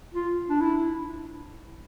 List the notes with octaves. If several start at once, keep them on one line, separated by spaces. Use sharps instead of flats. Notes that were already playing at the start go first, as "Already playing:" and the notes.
F4
D4
E4